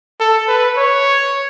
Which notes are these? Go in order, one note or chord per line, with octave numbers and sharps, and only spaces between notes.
A4
B4
C#5